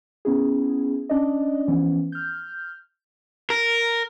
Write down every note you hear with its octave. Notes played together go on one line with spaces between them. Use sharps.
B3 C#4 E4 G#4
C#4 D4 D5 D#5
E3 F3 B3 C#4
F6 G6
A#4